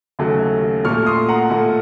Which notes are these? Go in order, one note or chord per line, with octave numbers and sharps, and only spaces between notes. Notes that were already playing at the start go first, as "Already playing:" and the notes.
D#2 C#3 F#3 A3
A#2 A3 C#6 F6
C6 D#6
F#5 A#5
A#2 A3